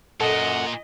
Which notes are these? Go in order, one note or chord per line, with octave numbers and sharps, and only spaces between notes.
F#2 A#2 A4 D#5 F#5